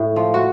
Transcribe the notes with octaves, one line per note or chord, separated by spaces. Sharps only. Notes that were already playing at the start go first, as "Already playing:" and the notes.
Already playing: A2
F3
F#4